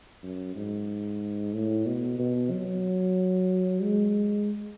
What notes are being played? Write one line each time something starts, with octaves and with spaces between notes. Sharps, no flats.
F#2
G#2
A2
B2
B2
F#3
G#3